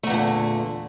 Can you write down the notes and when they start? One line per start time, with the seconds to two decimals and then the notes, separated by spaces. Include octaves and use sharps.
0.03 A3
0.07 E2
0.10 A#2
0.14 D3